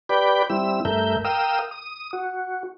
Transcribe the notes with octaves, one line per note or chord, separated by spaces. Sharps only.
G4 B4 D5 B5 G6
G3 C4 E4 E6
G2 A3 A#4 E5 G6
A#4 F5 G5 D#6 E6
D#6
F#4